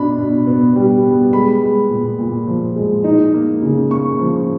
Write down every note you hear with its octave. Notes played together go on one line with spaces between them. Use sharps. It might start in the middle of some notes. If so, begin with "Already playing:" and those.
Already playing: B2 D4 B5
B2
B3
G3
B3
G#3 B5
G#3
A#2
A#2
F3
G#3
D#4
A#3
C#3
A#3 C#6
F3